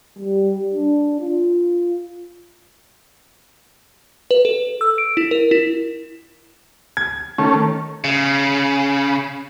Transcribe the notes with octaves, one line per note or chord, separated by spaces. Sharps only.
G3
D4
F4
B4
A4
E6
D7
E4
A#4
E4
G#6
D#3 A3 C#4
C#3